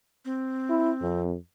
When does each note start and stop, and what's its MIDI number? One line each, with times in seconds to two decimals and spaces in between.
0.25 1.22 60
0.70 0.91 64
1.02 1.36 41